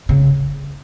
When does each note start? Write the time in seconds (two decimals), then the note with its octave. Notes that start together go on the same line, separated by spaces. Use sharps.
0.09 C#3